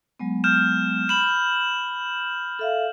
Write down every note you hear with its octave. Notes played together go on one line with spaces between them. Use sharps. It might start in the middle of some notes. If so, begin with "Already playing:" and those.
F#3 G#3 B3
F6 G6 E7
B5 E7 F#7
A4 E5 F5